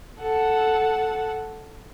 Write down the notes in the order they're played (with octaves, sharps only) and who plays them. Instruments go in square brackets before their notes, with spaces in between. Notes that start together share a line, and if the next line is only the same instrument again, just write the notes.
[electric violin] A4 F#5